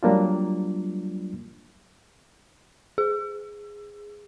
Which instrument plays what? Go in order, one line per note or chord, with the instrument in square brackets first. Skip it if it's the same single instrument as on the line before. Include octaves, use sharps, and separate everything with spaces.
[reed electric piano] F#3 G3 A#3 D4 F4
[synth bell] G#4